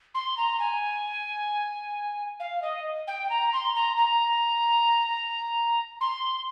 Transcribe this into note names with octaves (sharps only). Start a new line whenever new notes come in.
C6
A#5
G#5
F5
D#5
G5
A#5
C6
A#5
A#5
C6